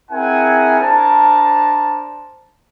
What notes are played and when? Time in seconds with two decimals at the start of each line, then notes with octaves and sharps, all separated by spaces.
0.11 C4 E4 G#4 A#4 F#5 G#5
0.79 D4 A#4 C5 A5